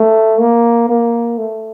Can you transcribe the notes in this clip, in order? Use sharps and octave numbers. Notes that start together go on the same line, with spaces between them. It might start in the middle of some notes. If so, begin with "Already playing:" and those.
Already playing: A3
A#3
A#3
A3